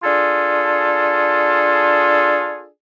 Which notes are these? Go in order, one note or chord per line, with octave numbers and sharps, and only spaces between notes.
D4 F4 G#4 A4